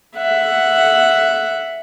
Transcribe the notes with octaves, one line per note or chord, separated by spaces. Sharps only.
E5 F#5